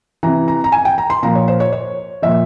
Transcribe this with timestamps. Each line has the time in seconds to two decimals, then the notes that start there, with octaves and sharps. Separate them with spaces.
0.23 C3 E3 A#5
0.48 A#5
0.64 A#5
0.72 G#5
0.85 G5
0.98 A#5
1.10 C6
1.23 A#2 F3 A#5
1.35 C#5
1.48 C5
1.60 C#5
1.72 C#5
2.22 A#2 F3 E5